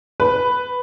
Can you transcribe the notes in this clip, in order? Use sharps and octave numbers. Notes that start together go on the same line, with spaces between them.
B4